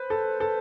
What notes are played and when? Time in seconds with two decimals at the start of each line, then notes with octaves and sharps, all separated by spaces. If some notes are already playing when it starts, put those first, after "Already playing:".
Already playing: B4 C5
0.10 A4
0.40 A4